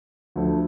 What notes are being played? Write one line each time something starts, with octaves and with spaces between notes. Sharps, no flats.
D2 D3 F3 A3